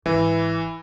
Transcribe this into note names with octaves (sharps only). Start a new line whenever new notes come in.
G#1 E3